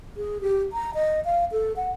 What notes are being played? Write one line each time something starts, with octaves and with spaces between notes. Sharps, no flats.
G#4
G4
A#5
D#5
F5
A4
F#5